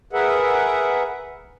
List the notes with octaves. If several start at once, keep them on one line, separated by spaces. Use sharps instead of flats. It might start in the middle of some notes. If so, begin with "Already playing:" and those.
G#4 A#4 B4 E5 F#5